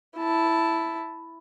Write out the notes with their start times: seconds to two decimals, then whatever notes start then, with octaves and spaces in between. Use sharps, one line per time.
0.17 E4 A5